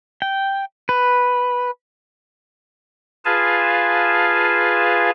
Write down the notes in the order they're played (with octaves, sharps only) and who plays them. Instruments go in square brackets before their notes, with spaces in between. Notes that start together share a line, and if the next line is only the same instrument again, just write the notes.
[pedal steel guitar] G5
B4
[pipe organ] F4 G#4 B4 F5 G#5 A5